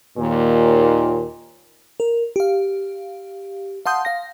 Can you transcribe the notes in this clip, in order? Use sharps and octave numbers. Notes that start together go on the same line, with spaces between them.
D#2 A#2
A#4
G4 F5
F5 F#5 A5 C6 D#6 G6
F5 A#6